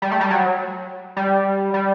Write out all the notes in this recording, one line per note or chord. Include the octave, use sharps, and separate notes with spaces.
G3
A3
G3
F#3
G3
G3